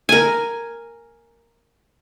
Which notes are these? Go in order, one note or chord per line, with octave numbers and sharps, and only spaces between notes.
A#4 G#5